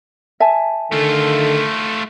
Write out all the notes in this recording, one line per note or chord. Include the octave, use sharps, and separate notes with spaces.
E5 G#5 A5
D3 D#3 A3 F4 A4